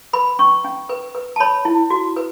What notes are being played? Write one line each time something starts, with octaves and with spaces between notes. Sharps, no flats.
B4 B5
C#4 C#6
C#4
B4
B4
A5
C#5 B5
E4
F#4
B4